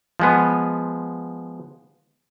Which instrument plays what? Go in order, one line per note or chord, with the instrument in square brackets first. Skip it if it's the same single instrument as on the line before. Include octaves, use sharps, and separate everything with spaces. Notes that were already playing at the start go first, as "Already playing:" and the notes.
[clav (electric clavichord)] F3 G#3 B3